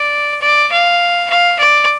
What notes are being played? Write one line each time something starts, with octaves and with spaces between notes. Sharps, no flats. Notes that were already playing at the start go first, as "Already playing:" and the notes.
Already playing: D5
D5
F5
F5
D5